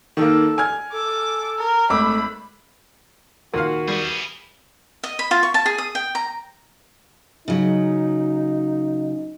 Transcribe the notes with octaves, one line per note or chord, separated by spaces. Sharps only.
D#3 A#3 A4
G#5 F6 G#6
A4 D6
A#4
G#1 A3 B5 D6 E6
D#2 A#2 D#3 F#4 A#4 F5
G3 G#4 B4
D#5
B5
F4
C#6
A5
G#4
D#6
G5
A#5
C#3 F#3 D#4